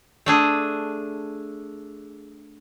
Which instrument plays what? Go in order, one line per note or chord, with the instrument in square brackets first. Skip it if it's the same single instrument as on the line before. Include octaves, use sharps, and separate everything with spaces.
[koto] A3 D4 G#4